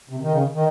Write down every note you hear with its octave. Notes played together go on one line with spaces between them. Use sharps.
C3
D#3
C#3
D#3